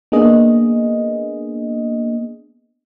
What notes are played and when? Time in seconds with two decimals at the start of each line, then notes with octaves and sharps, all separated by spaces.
0.12 A#3 B3 D4 G#4 D#5